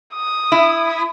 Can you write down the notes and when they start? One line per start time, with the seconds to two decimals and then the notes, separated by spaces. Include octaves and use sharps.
0.14 D#6
0.52 E4